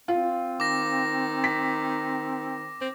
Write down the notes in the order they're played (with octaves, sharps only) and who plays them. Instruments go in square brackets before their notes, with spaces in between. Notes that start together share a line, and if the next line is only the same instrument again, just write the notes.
[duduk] C4 [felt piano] F4
[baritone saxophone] D#3 [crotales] D6 A#6
[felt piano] B6
[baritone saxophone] C4